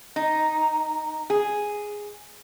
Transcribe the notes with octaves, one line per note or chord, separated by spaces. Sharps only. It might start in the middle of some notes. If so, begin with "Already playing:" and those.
D#4
G#4